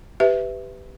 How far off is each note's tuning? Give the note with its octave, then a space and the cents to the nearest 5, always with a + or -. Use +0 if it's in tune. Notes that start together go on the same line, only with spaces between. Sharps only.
G4 +0 B4 +15 E5 +0